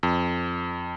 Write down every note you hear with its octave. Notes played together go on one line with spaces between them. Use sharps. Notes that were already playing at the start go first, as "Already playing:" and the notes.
F2